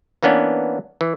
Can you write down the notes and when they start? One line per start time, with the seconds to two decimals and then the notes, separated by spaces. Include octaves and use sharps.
0.23 E3 A#3 B3 C#4 D4
1.01 E3